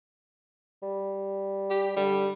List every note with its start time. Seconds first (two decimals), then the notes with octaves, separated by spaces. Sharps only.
0.83 G3
1.70 G4
1.97 D3 G3